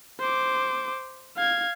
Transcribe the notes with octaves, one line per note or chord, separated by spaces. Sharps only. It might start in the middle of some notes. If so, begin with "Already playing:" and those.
C5 D6
F5 G#6